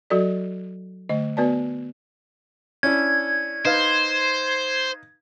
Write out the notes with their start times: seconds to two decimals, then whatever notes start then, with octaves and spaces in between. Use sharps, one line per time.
0.10 F#3 F#4 A4 D5
1.09 D3 A3 D#5
1.37 B3 F#4 B4 D5 A5
2.83 C#4 D4 E4 G#6
3.65 D#4 B4 C5 F5